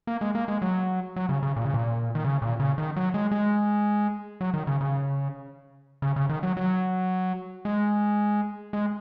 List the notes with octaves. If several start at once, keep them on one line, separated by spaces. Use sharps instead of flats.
A#3
G#3
A#3
G#3
F#3
F#3
C#3
C#3
A#2
C#3
A#2
D#3
C#3
A#2
C#3
D#3
F#3
G#3
G#3
F#3
D#3
C#3
C#3
C#3
C#3
D#3
F#3
F#3
G#3
G#3